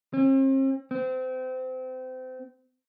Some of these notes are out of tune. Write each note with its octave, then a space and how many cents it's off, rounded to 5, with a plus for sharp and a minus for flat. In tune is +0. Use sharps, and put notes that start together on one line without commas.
C4 +45
C4 -30